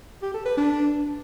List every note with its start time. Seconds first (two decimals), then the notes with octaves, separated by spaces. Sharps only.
0.22 G4
0.34 A4
0.46 B4
0.57 D4